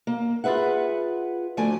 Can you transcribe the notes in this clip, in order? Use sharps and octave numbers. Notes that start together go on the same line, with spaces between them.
A#3
F4 G#4 B4 E5 F#5
D2 F3 A3 D5 G#5